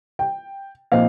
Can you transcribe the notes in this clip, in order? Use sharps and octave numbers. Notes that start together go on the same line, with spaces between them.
G5
A#2 F3 C4 D#4 F5